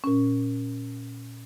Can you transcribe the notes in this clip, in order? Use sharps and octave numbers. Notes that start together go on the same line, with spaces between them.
A#2 C#4